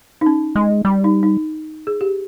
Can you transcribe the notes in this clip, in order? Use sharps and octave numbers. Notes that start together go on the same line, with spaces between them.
D#4
C#4
G#3
G3
D#4
D#4
G#4
G4